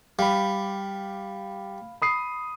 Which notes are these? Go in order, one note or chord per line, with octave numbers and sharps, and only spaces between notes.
G3 F5 B5
B5 D#6 C7